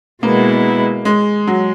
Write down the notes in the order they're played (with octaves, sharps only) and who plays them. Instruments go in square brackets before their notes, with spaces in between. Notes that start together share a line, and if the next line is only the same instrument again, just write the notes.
[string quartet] B2 G#3 B3 E4 [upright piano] A#3
[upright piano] G#3
F#3